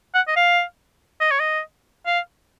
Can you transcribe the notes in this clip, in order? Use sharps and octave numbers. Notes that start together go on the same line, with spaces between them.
F#5
D#5
F5
D#5
C#5
D#5
F5